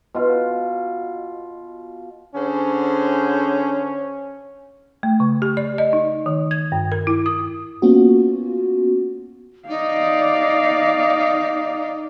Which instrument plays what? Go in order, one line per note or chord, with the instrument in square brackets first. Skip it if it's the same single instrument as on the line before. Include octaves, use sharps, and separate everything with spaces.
[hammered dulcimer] B2 F4
[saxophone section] D3 G#4 C5 [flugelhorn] C#4
[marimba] A3
C#3
G4
D5
D#5
D#4
D#3
G#6
G2
A#4
E4
D#6
[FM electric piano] A#3 B3 C#4 F4 F#4
[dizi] D#4 [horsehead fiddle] D5 F5